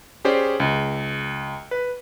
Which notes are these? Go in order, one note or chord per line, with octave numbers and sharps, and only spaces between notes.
C#4 G4 G#4 C5 D5
C#2
B4